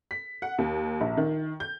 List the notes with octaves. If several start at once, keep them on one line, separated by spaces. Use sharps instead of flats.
B6
F#5
D#2
A#1
D#3
G6